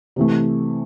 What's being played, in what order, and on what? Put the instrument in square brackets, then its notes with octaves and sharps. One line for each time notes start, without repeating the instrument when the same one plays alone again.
[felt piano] C3 E3 A3